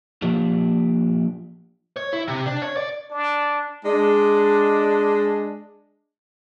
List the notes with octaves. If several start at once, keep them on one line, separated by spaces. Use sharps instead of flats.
F3 A#3 D4 F4 G4
C#5
E4
C3
D4
C#5
D5
D4
G#3 D4